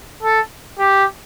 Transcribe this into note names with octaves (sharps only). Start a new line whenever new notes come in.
A4
G4